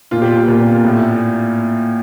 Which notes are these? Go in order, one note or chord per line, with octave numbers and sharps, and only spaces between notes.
A#2 F4
G4
F4
A#2
A2